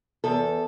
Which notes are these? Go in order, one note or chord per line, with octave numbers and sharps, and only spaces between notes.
E2 A4